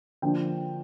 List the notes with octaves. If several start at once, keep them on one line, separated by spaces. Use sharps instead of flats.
D3 F3 A#3 D4 G5